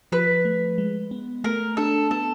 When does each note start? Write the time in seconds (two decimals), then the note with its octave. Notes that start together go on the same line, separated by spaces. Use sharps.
0.12 F3 B4
0.45 A3
0.78 G#3
1.11 B3
1.44 A3 A#4
1.77 D4 A4
2.11 B3 A4